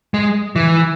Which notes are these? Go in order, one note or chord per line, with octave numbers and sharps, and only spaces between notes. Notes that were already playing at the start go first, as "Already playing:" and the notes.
G#3
E3